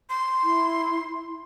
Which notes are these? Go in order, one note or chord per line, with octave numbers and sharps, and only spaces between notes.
C6
E4